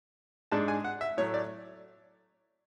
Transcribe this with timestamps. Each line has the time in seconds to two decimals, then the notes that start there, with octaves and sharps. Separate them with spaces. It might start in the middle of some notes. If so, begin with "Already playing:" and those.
0.52 G#2 G#3 D4 A5
0.68 G#5
0.84 F#5
1.01 E5
1.17 A2 F#3 A3 C#5
1.34 D5